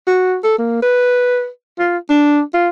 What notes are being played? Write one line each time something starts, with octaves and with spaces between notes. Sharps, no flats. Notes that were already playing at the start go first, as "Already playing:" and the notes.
F#4
A4
A#3
B4
F4
D4
F4